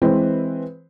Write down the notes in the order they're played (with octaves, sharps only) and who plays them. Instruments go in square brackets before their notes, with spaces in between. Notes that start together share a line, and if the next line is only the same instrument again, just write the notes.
[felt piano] E3 G#3 C4 E4 B4 C5